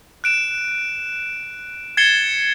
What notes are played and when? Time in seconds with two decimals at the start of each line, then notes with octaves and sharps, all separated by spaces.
0.24 F#6 D7 E7
1.97 G#6 A6 C7 C#7 E7 G7